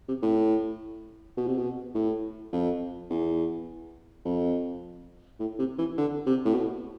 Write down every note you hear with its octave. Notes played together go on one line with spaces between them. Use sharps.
C3
A2
B2
C3
B2
A2
F2
E2
F2
A2
C3
E3
D3
C3
A2
B2